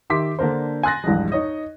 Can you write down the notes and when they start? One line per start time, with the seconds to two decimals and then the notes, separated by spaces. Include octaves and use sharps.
0.10 D#3 G4 E5 C6 D6 B6
0.39 D3 A#3 D4 A#4 C5
0.83 G#5 C6 F#6 A6 A#6
1.04 A#1 E2 G2 G#3
1.32 D#4 C#5 D#5